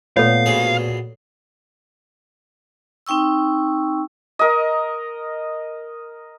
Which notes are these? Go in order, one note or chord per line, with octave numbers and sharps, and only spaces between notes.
A#2 A3 B3 A4 C#5 F5
A#1 B2 G#4
C4 D#4 G5 C#6 E6
A#4 D#5